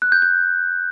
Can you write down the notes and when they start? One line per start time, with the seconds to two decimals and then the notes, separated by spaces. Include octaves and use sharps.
0.02 F#6
0.12 G6
0.22 G6